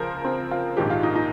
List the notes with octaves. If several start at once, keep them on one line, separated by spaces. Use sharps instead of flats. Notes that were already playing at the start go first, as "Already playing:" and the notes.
Already playing: C#2 C#3 F3 A#4 C5
C4
F4
A#1 G#2 D#3 G4
F4
D#4
D#4